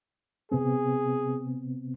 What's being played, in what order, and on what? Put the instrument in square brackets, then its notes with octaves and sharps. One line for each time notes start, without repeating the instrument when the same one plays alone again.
[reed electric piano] C3 B3 C4 [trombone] G#4